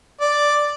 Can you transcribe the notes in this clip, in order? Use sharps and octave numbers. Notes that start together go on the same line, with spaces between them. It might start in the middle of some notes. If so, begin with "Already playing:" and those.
D5